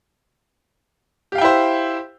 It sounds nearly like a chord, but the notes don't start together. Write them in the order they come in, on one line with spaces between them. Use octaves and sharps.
G4 F5 G5 E4 C5